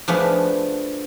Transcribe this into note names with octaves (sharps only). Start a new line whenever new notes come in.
F3 A3 B3 D4 G#4 B4